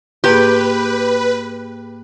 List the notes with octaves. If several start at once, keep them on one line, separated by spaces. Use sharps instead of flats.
G#2 A#3 G4 G#4 B4